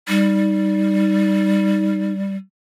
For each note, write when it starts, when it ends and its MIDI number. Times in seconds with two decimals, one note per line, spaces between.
0.08 2.35 55
0.08 2.13 63